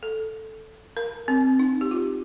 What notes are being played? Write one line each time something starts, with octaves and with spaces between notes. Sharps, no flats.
A4
A#4
C4
D#4
G4
F4